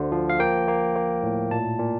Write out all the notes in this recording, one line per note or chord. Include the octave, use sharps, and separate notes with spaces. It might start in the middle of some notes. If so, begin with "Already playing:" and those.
Already playing: D2 D3 A3 C5
F3
F5
A#3 G5
A#3
A#3
A2
A#2 A5
A#2